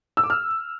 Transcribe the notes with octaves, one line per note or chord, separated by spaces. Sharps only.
E6
D6
F6